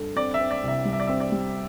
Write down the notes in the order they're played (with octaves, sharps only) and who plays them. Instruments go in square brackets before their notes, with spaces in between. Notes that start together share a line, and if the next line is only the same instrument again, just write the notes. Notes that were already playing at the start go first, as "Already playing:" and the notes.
Already playing: [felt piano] G2 A4
[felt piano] C4 [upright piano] D5
[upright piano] E5
[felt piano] C4
[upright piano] D5
[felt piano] C2 [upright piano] E5
[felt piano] G3
[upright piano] E5
D5
[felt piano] C4 [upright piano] E5
[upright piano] D5
[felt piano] G3